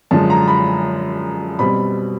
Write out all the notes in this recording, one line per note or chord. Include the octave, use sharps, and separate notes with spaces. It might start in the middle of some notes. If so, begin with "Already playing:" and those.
F#2 D3 F3 G#3 A5
A#5
B5
B2 G3 C4 B5